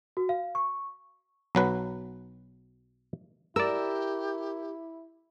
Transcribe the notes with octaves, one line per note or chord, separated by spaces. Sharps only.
F#4
F5
C#6
B1 F#3 B4
E4 G4 A#4 D5 E6